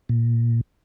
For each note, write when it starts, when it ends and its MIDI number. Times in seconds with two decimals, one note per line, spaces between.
0.09 0.61 46